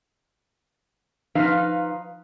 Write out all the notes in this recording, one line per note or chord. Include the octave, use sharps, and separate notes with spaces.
F3 D#4 B4 F5